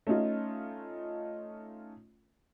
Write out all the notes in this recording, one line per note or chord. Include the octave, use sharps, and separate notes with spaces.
A3 C#4 D#4 F4